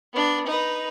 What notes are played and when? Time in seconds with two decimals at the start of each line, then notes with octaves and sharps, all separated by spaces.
0.13 B3 D4
0.46 D#4 B4